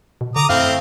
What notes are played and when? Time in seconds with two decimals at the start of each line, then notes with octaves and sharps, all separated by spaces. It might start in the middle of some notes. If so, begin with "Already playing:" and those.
0.21 B2
0.36 D3 A#5 D6 D#6
0.49 F#2 A3 C4 E4 F5